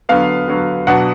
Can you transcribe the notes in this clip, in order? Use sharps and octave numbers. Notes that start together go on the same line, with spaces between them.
D3 F#3 B3 F5
D3 F#3 B3
B2 F#3 B3 D4 F#5